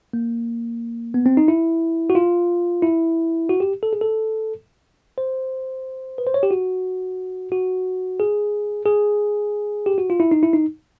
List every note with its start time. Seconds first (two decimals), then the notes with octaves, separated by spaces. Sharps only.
0.13 A#3
1.14 B3
1.26 C4
1.37 D#4
1.48 E4
2.10 F#4
2.15 F4
2.82 E4
3.49 F#4
3.60 G4
3.83 A4
3.93 G#4
4.01 A4
5.18 C5
6.18 B4
6.27 C5
6.34 C#5
6.43 G4
6.51 F#4
7.52 F#4
8.20 G#4
8.86 G#4
9.86 G4
9.98 F#4
10.10 F4
10.20 E4
10.31 D#4
10.43 E4
10.53 D#4